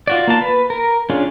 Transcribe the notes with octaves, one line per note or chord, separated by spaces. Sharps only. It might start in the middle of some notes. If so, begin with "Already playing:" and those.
F4 F#4 D5
A#3 F4 A5
B4
A#4
C#4 D4 F4 G#4